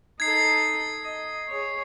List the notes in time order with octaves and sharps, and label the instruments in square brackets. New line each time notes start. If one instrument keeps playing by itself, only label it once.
[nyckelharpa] D#4 A4 [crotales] G#6 C7
[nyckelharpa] D#5
G#4 C#5